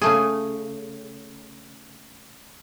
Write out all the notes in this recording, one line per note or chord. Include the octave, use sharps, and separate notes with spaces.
C#3 A3 G#4